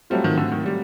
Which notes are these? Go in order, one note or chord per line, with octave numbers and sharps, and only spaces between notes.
F#3 G3 A3 C4 F4
D#3
D3
D#3
G3